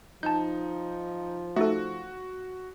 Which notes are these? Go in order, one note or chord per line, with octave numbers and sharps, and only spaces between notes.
F3 D#4 A5 G6
A3 D#4 F#4 A4